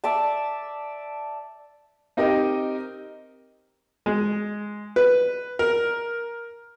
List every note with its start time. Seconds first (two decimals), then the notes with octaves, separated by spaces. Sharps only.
0.04 D5 E5 A5
2.17 C4 D#4 G4 A#4 D#5
4.06 G#3
4.96 B4
5.59 A#4